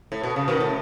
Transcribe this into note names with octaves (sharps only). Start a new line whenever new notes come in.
A2
B2
C#3
B2 D#3
A2